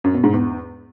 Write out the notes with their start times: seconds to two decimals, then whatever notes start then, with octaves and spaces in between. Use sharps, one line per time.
0.04 F#2
0.14 B2
0.24 G#2
0.33 E2